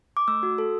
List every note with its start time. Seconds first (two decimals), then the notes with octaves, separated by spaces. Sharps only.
0.17 D6
0.28 A3 E6
0.43 F#4
0.58 A4